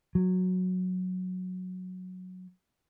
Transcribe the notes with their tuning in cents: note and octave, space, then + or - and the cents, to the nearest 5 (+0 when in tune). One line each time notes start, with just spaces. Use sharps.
F#3 -10